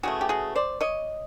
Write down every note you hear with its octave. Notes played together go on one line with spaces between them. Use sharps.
C#3 E3 A3 F#4 G#4
G4
F#4 G#4
C5 D5
C#5 D#5